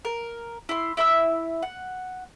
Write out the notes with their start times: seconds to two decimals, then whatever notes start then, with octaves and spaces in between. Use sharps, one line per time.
0.05 A#4
0.69 E4 C6
0.97 E4 E5 B5 E6
1.62 F#5